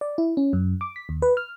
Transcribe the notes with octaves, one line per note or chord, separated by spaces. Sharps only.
D5
E4
C#4
F#2
D6
B6
D#2
B4
F6